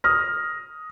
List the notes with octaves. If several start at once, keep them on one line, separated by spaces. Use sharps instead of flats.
D#6 F6 A#6